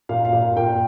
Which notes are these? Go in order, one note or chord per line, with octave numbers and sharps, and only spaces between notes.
A#2 F5
F5
A#2
F5
A#2 G5